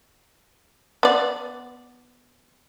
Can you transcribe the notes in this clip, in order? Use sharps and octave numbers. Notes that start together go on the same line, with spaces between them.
B3 D5